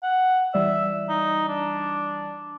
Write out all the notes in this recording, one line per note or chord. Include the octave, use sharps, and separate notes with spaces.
F#5
E3 G3 D5 E5
D#4
D4